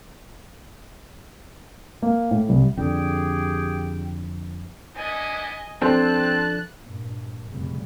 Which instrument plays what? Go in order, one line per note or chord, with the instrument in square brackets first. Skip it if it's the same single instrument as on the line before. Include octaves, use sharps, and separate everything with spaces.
[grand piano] A#3
A2
C2
[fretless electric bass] F2 D3 G3 [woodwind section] G4 G#4 G5
[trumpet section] B3 D4 E4 [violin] D#5 G#5
[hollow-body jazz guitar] F3 D4 A4 [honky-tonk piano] C4 [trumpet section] A5 [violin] F#6
[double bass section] G2 A#2
F1 F2 A#2 C#3 G3